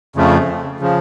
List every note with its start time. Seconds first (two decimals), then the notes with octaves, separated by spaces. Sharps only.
0.16 F2 C#3 F3 A3
0.80 C#3 F3